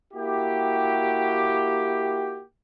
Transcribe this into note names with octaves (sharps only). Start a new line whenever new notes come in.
A#3 E4 F#4 G4